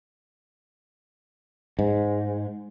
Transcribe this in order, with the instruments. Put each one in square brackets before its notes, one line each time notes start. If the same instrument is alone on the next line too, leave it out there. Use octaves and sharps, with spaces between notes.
[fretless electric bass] G#2